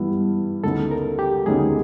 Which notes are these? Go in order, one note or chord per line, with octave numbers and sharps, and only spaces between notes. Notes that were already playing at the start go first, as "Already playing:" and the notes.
Already playing: G2 E3 G3 B3 E4
D2 C#3 F#3 B3 D#4 A4
A#4
G4
D2 C#3 F#3 B3 D#4 G#4